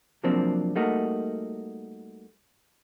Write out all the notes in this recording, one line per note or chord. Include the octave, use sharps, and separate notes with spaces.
C3 F3 F#3 A#3 C4 D4
G3 A3 A#3 D#4 F#4